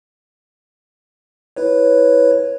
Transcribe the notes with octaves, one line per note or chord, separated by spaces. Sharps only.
E4 B4 C#5